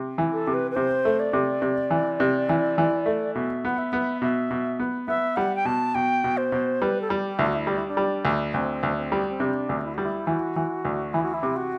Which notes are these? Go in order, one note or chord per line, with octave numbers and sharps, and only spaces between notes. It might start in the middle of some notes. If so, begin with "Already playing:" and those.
Already playing: C3
E3
A4
C3
B4
B4
C3 C5
A3
D5
C3
C3
E3
C3
E3
E3
A3
B2 E5
B3 F#5
E5
B3
B2 E5
B2
B3
B3 E5
G3 F#5
G5
B2 A5
B2 G5
B2
C5
B2
G3 B4
A4
G3 G4
D2 E4
F#4
E4
G3 D4
E4
D4
G3
D2
D2 C4
D2
C4
G3
C4
C3 D4
D2
E4
G3 F#4
E4
E3 F#4
E3
D2
E3 E4
F#4
E4
C3
F#4